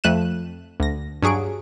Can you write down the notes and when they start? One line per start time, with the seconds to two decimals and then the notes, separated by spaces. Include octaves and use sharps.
0.04 F2 A3 F#6 D#7 E7
0.80 D2 A#6
1.22 G2 F#3 G#4 C#6 D7